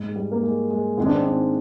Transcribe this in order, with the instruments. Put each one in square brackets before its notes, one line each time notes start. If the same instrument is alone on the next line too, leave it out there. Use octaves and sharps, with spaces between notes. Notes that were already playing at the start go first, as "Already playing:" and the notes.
Already playing: [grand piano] G#2
G#3
G3
A#3
G#3
G#3
[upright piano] G#2 D#3 G#3 [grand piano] C4
[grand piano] D4
C4
D4